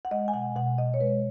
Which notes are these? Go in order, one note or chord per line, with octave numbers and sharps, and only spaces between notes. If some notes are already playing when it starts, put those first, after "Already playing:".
F#5
G#3 D#5
G#5
B2 F#5
B2 F#5
B2 D#5
C#5
G#3 B4